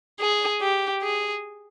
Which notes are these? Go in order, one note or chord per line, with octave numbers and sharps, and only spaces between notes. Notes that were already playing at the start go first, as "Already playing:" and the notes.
G#4
G4
G#4